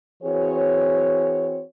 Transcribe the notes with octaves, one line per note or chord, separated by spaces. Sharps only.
E3 C4 F#4 G#4 C#5